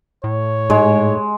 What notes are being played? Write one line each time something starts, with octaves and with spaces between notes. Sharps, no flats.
A2 C#5
G#2 G#3